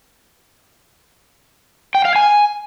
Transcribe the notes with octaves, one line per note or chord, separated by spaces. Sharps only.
G5
F5
G#5